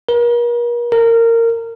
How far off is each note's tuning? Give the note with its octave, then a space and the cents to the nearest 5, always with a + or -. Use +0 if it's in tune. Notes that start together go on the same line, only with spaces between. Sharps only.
A#4 +40
A#4 -20